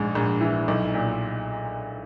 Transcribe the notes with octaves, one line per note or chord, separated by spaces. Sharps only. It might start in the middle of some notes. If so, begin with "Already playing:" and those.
Already playing: A#1 G#2
A#1
E3
B1
A#2